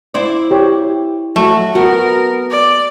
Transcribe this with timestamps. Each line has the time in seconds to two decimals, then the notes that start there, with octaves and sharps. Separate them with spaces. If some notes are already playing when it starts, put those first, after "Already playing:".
0.14 E4 C5 D5
0.51 G4 C#5
1.36 F#3 A3 F#4
1.75 B3 F#4 A#4 B4
2.51 D5